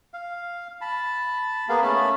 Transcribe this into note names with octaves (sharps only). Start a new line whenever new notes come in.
F5
A5 B5
A#3 B3 G#4 F5
A3 C#4 A5 B5